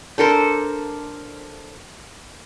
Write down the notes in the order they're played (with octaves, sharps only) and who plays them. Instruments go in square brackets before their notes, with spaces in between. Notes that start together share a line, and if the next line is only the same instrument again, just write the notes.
[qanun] D4 A4 A#4 C5